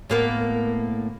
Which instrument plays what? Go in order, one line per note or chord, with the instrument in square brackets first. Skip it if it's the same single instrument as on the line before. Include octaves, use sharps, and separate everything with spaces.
[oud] A2 A#3 B3